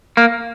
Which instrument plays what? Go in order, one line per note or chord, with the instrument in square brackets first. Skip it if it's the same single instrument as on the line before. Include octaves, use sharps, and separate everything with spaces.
[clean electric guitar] A#3